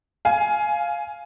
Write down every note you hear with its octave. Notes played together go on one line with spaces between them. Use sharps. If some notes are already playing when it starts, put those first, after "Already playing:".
F5 G#5